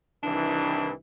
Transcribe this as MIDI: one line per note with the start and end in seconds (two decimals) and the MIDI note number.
0.23 0.93 36
0.23 0.93 51
0.23 0.93 52
0.23 0.91 62